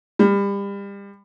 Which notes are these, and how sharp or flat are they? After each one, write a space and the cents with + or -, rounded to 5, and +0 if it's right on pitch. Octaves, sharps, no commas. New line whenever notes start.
G3 +30